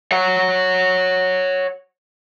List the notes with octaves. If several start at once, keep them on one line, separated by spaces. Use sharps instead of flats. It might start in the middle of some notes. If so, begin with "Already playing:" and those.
C#5 F#5